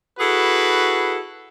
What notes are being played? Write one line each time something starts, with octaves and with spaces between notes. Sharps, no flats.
E4 F#4 G#4 A4 B4